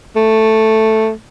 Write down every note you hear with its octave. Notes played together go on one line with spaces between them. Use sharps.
A3